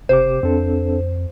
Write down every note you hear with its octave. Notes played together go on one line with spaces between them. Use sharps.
F#1 C3 G4 C5 D6
F2 C4 D4 A4